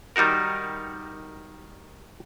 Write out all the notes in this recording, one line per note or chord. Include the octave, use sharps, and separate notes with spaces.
D#3 G3 D#4 F#4 A#4